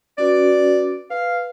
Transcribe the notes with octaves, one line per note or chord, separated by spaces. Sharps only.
C#4 F#4 B4 D5
B4 F5